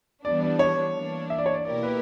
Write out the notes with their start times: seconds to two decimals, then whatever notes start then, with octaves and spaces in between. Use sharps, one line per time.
0.24 E3 G3 B3 D4 D5
0.42 D5
0.59 C#5
0.94 E3 A#3 D4
1.30 E5
1.38 D5
1.46 C#5
1.54 D5
1.65 B2 A#3 E4 G4 A#4 D5
1.83 B4